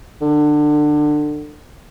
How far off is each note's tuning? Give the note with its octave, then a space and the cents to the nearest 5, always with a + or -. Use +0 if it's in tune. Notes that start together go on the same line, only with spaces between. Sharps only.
D3 +25